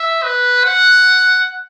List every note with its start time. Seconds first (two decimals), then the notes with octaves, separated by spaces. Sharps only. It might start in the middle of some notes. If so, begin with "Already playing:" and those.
Already playing: E5
0.23 B4
0.64 F#5